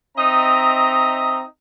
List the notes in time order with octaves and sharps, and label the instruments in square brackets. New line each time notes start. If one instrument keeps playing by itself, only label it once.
[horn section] C4 D#4 D#5 E5 A#5